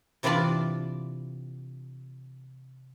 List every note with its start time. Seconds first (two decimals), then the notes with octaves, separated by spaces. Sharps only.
0.23 C3 E3 D4 F4 D5 A5